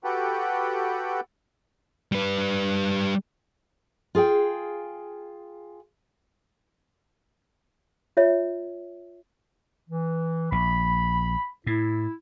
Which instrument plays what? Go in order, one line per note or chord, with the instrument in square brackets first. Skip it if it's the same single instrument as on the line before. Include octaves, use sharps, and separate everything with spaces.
[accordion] F#4 G4 A4 B4 F#5 G5
[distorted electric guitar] G3 B4
[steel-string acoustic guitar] F4 G#4 F5 G5
[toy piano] F4 C#5 E5
[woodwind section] E3
[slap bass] A#1 [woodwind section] B5
[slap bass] A2 [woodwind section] E4